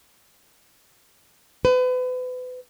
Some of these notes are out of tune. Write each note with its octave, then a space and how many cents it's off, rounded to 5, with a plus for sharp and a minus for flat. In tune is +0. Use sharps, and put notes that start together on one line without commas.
B4 +35